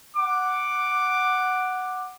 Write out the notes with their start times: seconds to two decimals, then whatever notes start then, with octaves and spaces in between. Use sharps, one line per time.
0.16 F#5 D6